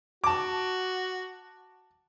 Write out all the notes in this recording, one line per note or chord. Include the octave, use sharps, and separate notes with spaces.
F#4 A5 D6